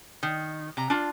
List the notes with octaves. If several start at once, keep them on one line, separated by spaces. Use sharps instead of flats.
D#3
C3 A#5
D4 F4